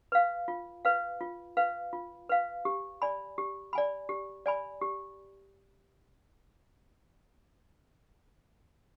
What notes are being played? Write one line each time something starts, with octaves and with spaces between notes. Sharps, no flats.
B4 F5
F4
B4 F5
F4
B4 F5
F4
B4 F5
G4
D5 G#5 B5
G4
D5 G#5 B5
G4
D5 G#5 B5
G4